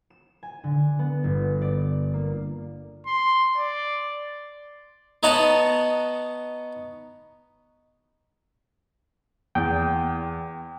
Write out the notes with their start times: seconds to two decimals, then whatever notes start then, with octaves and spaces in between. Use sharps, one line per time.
0.10 E7
0.43 G#5
0.64 D3
0.99 B3
1.24 G1
1.62 D5
2.14 A#3
3.07 C6
3.57 D5
5.23 B3 D#4 C#5 D#5 F#5 A5
9.55 E2 G5